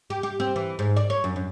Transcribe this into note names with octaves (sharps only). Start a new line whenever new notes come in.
G4
G4
C4
E3
G#2
D5
C#5
F#2
F#2